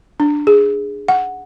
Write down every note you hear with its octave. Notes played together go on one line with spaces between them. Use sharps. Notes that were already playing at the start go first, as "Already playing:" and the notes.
D4
G#4
F#5